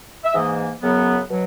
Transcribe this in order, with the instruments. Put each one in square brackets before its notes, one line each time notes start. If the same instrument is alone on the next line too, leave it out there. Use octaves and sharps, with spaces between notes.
[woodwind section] E5
G#2 E3 A#3 D#5
F#2 C#3 F#3 B3
B2 F#3